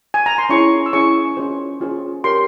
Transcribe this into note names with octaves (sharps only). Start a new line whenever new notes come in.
G#5
A#5
C6
C#4 E4 G#4 C#5 C#6
E6
C#4 E4 G#4 C#5 C#6
C#4 F4 G#4 C5
C#4 F4 G#4 C5
G4 A#4 C#5 C6